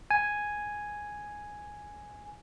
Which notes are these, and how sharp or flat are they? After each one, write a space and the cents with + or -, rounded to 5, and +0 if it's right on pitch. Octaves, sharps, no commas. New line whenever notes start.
G#5 +0